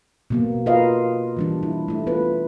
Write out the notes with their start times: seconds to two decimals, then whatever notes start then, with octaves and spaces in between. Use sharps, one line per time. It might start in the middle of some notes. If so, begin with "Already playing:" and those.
0.30 B2 A#3 B3
0.66 F4 A#4 B4 D#5 F5
1.37 E3 G3 D4
1.63 E4
1.88 A3 E4
2.07 B3 F4 B4